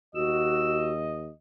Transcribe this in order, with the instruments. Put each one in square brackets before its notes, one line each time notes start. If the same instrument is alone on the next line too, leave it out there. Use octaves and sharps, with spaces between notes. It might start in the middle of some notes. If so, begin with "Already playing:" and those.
[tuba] D#2 [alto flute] F#4 [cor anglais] D#5 [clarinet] E6